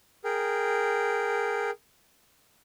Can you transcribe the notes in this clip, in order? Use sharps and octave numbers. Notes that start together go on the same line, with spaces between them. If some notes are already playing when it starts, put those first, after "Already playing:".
G#4 A#4 G5